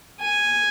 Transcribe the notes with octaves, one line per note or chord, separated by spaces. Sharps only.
G#5